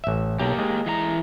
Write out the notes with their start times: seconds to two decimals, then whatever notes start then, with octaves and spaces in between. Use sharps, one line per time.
0.04 A1 E5
0.39 B1 A#3 G4
0.59 G#3
0.86 E3 F5 A#5